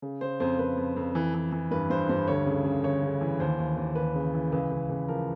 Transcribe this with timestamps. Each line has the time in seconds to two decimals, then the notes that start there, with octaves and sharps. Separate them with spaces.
0.02 C#3
0.21 C#3 C5
0.40 F2 C5
0.59 F2 B4
0.77 F2
0.96 F2
1.15 E3
1.34 E3
1.52 E3
1.71 G2 B4
1.90 G2 C5
2.09 G2 C5
2.28 D2 C#5
2.46 C#3
2.65 C#3
2.83 D2 C#5
3.03 C#3
3.21 E3
3.40 D#2 C5
3.59 D#2
3.77 D#2
3.95 D#2 B4
4.15 C#3
4.34 E3
4.52 C#2 B4
4.71 C#2
4.89 C#2
5.08 F3 A#4